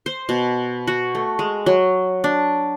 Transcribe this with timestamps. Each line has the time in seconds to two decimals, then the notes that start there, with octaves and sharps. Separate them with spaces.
0.06 C5
0.29 B2
0.88 F#4
1.15 A3
1.39 G#3
1.66 F#3
2.24 D4